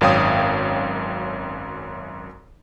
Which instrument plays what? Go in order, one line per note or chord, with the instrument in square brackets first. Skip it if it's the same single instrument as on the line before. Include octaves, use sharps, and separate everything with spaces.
[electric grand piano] G#1 F#2 C#5 F5 G5 D#6